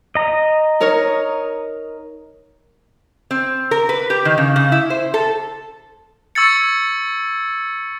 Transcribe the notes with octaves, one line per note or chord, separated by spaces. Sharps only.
D#5 A#5
D#4 A#4 C#5
C4
A#4
B4
G4
D#3
C#3
C#3
E4
C5
A4
C#6 E6 G#6 A6 C#7